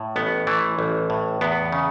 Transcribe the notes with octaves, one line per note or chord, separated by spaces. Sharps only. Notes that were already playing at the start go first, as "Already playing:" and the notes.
Already playing: A2
A1 B3
E3 A3
A1
A2
E2 B3
C#3